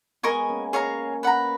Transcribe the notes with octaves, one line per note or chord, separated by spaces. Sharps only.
G#3 B3 A#4 D#5 G#5 C#6
A#3 C#4
G#4 C#5 F5 A#5
B4 F#5 A#5